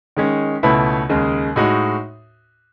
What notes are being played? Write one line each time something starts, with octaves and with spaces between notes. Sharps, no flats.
D#3 G#3 C#4
C#2 B2 A3 E4 B4
D#2 C#3 G#3
A2 G#3 D#4 F#4